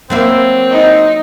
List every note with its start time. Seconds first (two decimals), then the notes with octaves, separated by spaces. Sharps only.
0.10 F#3 A#3 C4 E4
0.71 D#4